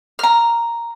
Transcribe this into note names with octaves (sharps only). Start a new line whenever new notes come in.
A#5 F6